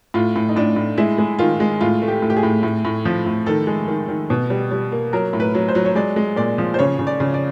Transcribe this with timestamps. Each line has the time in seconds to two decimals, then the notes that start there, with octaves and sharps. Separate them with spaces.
0.14 A2 F4
0.36 A2
0.49 D#4
0.56 A2 D4
0.76 A2
0.97 G#3 E4
1.18 G#3
1.39 D#3 F4
1.60 G#3
1.81 A2 F4
2.02 A3
2.08 G4
2.22 A2
2.30 G4
2.37 G#4
2.43 A2
2.63 A2
2.85 A2
3.05 F3
3.26 A2
3.46 D#3 A4
3.67 G#3
3.88 D#3
4.08 D#3
4.30 B2
4.50 G3
4.71 G3
4.92 A#3
5.13 F#3 A#4
5.33 A2
5.40 B4
5.55 F#3
5.68 C5
5.75 F#3
5.85 C#5
5.95 G#3 D5
6.16 G#3
6.37 A#2 D5
6.58 F3
6.74 C5
6.79 C#3 C#5
6.99 C#3
7.07 D5
7.20 C#3
7.34 D5